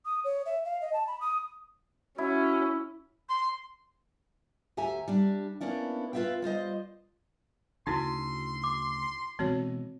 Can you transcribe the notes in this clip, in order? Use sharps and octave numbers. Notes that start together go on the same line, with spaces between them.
D#6
C#5
E5
F5
D#5
A5
B5
D#6
C#4 E4 F#4
C6
D2 G4 E5 G#5 A#5
G3 D4
A#3 B3 C#4 D4 E4
F4 B4 D5 E5 F5 G5
G3 F4 C5 D#5
D2 C#3 D#4 E4 F#4 C6
D6
B2 E3 G#3 C4 F#4 C#5